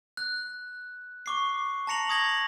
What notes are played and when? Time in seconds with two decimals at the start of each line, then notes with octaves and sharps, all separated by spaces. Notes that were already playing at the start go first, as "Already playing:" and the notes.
0.17 F#6
1.26 C#6 D6 C7
1.87 A5 A#5 A#6 C#7 F7 F#7
2.08 C#6 D#6 G#6 A#6 F#7